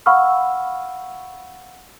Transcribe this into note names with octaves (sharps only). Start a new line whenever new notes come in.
F5 F#5 B5 C#6 E6 F6